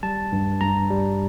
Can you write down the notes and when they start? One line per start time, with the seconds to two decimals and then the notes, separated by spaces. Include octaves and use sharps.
0.03 G3 A5
0.32 G2
0.61 G2 A#5
0.90 G3